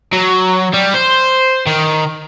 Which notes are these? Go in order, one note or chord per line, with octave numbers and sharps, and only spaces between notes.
F#3
G3
C5
D#3